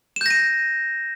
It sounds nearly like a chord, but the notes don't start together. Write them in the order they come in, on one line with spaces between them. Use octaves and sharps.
E7 G6 A#6 D#7